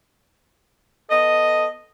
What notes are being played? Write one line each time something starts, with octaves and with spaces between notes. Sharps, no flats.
B3 A4 D#5